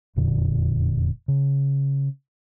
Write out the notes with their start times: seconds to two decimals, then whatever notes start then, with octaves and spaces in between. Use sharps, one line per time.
0.16 E1 F2 A#2 D3
1.28 C#3